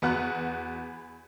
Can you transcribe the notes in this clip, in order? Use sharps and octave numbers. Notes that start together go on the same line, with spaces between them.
E2 B3 F#4 F#5 F#6